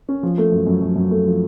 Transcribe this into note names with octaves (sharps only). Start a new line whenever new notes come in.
C#4
F3
A3
F#2
F#2
F#2
F#2
A3
F3